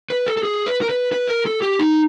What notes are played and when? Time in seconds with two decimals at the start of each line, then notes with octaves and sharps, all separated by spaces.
0.10 B4
0.27 A4
0.37 A4
0.43 G#4
0.66 B4
0.81 A#4
0.89 B4
1.12 B4
1.28 A#4
1.46 A4
1.62 G4
1.79 D#4